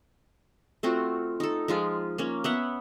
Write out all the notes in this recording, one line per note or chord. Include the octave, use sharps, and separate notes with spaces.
A3 C4 F4 F#4
D#4 A4
F3 G#3 F4
A#3 C#4
B3 E5 F#5